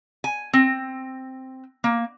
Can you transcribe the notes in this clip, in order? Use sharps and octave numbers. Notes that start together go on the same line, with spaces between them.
G#5
C4
A#3